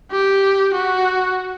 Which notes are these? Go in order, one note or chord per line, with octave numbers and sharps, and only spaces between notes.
G4
F#4